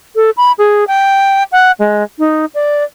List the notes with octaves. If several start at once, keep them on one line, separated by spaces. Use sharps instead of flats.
A4
B5
G#4
G5
F#5
G#3
D#4
D5